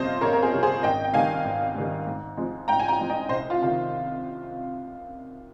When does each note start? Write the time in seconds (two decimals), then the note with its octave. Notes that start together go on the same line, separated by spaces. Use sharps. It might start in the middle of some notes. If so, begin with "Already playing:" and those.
Already playing: G1 F2 C3 G3 C4 C5 D#5 F5
0.21 G1 A#4 C#5
0.33 A#4
0.42 G#4 C5
0.52 F2 C3 G3 C4
0.63 G#4 C5
0.83 G#1 D#5 G5
1.04 G5
1.14 G#2 D#3 G3 F5 G#5
1.44 G#1
1.75 G#2 D#3 G3
2.06 G#2
2.37 F3 G#3 C4
2.68 G#2 G5 A#5
2.80 G#5
2.88 G5 A#5
2.99 F3 G#3 C4
3.10 D#5 G5
3.29 C2 C5 D#5
3.50 F4
3.61 C3 D#3 F4